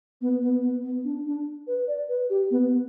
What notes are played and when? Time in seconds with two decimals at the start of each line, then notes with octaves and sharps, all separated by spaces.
0.21 B3
0.42 B3
0.62 B3
0.83 B3
1.04 D4
1.26 D4
1.67 B4
1.88 D5
2.09 B4
2.30 G4
2.51 B3
2.66 B3